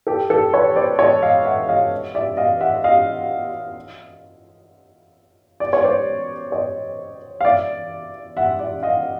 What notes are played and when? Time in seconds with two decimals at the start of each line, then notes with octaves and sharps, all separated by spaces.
0.07 G4 A4
0.30 G4 A4
0.53 B4 C#5
0.76 C5 D5
0.99 C#5 D#5
1.23 D#5 F5
1.45 E5 F#5
1.69 D#5 F5
2.15 D5 E5
2.37 D#5 F5
2.60 E5 F#5
2.84 D#5 F5
5.60 D5
5.73 C#5
5.84 C5 D5
6.52 C#5 D#5
7.41 F5
7.45 D5 E5
8.37 E5 F#5
8.59 D5 E5
8.83 D#5 F5